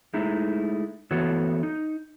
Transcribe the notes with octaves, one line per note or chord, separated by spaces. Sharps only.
G#3 A3 D#4 E4
E3 A3 B3 F#4 A4 C#5
D#4